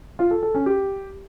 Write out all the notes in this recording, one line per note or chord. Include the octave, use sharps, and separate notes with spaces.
F4
A4
A4
C#4
G4